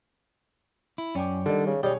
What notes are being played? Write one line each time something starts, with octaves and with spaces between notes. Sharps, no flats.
E4
F#2 C#4 D5 G5 D6
D3 D#3 G3 D#5
C#3
B1 G3 G#4 C#5 D#5